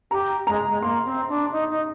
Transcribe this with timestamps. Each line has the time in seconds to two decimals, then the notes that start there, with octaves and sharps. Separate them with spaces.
0.11 G4 A#5
0.47 G#3 A#5
0.69 G#3
0.82 A#3 C6
1.05 C4
1.29 D4
1.52 D#4
1.70 D#4